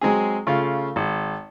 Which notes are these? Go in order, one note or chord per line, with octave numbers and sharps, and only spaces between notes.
F#3 G#3 C4 G#4
C#3 A3 F4
G#1